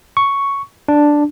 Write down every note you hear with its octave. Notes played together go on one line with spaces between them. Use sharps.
C#6
D4